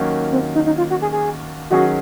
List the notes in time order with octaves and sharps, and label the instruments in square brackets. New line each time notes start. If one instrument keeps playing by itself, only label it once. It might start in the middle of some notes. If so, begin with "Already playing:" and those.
Already playing: [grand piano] D#2 D#3 F#3 A#3 C#4
[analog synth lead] C4
D#4
D#4
F4
F#4
G#4
G#4
[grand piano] D#3 F#3 C#4 G#4 [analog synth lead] F#4